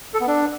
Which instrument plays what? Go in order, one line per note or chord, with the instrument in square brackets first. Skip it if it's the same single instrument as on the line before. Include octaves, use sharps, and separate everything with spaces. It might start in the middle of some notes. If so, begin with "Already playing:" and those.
[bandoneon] A4
B3
D4